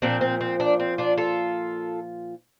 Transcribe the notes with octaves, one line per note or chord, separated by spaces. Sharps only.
A#2 F3 C4 D4
C4
C4
D4
C4
D4 F4
F4 A4